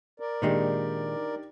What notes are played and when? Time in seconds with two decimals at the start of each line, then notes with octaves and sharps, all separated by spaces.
0.20 A#4 D5
0.42 A#2 D#3 G#3 D4 D#4 G4